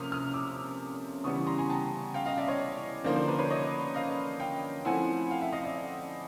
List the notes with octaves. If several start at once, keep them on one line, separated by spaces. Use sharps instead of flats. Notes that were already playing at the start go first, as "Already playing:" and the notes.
Already playing: C3 F3 A#3 C#4 D#6 F6
D#6 F6
D6 E6
C#3 E3 G3 B3 E4 C#6 D#6
A#5 C6
G#5 A#5
G5 A5
F5 G5
D#5 F5
D5 E5
C#5 D#5
D3 F3 A#3 D#4 C5 D5
C5
B4
B4 C#5
C#5 D#5
D#5 F5
F5 G5
F3 A3 C4 E4 F#5 G#5
F5 G5
E5 F#5
D#5 F5
D5 E5